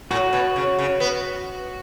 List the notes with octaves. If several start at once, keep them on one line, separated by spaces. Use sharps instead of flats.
A2 F#4
B2
C#3
C#3
B3